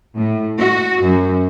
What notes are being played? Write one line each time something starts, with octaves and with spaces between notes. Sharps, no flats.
A2
F#4
F#2